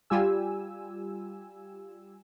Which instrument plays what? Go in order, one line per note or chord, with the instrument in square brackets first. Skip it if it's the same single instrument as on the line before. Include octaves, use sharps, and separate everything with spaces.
[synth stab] G3 F4 G4 G#5 E6